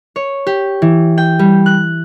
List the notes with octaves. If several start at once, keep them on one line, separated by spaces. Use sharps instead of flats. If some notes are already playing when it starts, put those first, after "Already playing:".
C#5
G4
E3
G5
G3
F#6